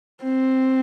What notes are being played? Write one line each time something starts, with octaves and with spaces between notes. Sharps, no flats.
C4